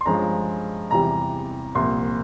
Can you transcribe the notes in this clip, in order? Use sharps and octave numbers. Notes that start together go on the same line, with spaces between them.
C6
G2 F3 G#3 C#4 A#5
E2 C3 E3 G3 A#5
C2 A#2 F3 C6